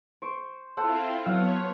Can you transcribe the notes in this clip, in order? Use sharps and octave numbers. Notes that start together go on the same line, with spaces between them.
C5 C#6 D7
C4 E4 F4 A4 C5 F#5
F#3 B3 C#5 F5 F#5